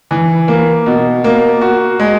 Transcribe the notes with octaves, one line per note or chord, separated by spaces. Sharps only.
E3
A#3
B2
A#3
F#4
G#3